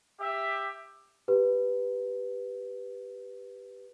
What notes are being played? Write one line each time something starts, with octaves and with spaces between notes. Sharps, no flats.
G4 E5
G4 B4